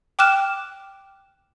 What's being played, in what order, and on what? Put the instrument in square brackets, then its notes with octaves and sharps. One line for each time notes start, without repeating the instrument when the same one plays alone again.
[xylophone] G5 D6 F6 F#6 E7